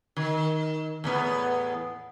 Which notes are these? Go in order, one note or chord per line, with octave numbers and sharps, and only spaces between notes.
D#3
E2 A2 B3